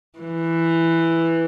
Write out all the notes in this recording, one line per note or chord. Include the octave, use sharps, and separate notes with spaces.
E3